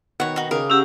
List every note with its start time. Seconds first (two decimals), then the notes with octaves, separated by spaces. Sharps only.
0.20 B2 D#3 C#5 F#5 B5
0.36 D#4 F#4
0.51 C#3 A#4 D6 D#6
0.70 C#4 G4 C#5 F#5 E6